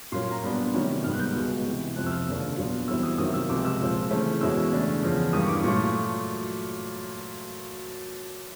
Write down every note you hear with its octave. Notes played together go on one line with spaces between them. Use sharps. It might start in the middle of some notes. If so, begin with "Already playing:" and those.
A#2 F#3 A#3 C#4 C6
A#5
A#2 G3 B3 D4 B5
C3 D#3 F#3 A3 C#4
G#2 D#3 G3 B3 F6
F#6
G6
C#2 B2 G#3
C#2 C3 E3
F2 C3 F3 F#6
E6
F6
D#2 C#3 F3 A#3 D4
A#2 F#3 B3 D4
E2 B2 G3 C4 E4 E6
D#6
C3 D#3 F#3 A#3 D#6
E6
C#2 C3 F3 G#3 D6
E6
A#2 F3 G#3 C4
C#3 E3 A3 C4
E2 B2 G#3 C#4 E4 E6
C#3 E3 A3 D4
E2 C#3 F3
G2 E3 G3 A#3 D#6
C#6
D6
A#2 F#3 A3 C#6